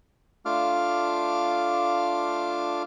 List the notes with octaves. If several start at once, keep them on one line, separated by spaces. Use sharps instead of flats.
A3 D4 F4 F5 D6 F6